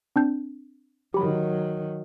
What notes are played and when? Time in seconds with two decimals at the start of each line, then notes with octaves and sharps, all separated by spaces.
0.16 C4 D4 G6
1.14 D#3 F#3 G4 B5